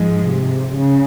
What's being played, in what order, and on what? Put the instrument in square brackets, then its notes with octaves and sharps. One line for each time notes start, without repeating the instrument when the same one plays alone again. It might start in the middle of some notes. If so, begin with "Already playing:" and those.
Already playing: [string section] G#2 F3 G#3
[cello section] C3
C#3